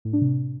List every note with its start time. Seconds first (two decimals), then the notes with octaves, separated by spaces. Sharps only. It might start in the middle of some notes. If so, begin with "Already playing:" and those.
0.05 A2
0.13 D4
0.22 C3